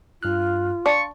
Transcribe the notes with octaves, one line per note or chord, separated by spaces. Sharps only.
G2 F4 F6 F#6
D4 F5 C6 C#6 A6